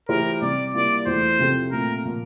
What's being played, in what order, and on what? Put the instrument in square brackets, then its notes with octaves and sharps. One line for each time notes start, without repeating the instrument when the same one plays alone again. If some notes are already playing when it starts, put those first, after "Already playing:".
[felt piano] E3 A3 E4 G4 C5 [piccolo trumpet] A#4
[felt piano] C3 G3 C4 [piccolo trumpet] D5
[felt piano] G3 A#3 E4 [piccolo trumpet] D5
[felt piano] E2 E3 A3 [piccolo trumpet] C5
[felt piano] C3 F3 C4 E4 A4
[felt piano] A#2 A3 C4 F4 [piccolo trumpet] A#4
[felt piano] A#2 F3 A#3